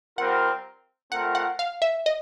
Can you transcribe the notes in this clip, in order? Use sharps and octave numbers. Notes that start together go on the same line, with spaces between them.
G3 C4 F4 A#4 F#5
A3 C4 F4 A#4 F#5
F#5
F5
E5
D#5